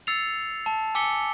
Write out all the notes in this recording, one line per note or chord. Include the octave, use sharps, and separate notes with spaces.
E6 A6 C7 C#7 F7
A5
G#5 D6 E6 B6 C#7 G7